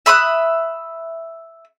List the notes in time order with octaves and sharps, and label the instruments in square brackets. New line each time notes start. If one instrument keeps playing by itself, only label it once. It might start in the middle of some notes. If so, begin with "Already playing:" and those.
[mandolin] E5 B5 D#6 F#6